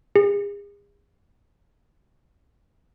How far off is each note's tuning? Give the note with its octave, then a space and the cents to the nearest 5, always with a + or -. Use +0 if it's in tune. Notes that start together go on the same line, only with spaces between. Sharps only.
G#4 -40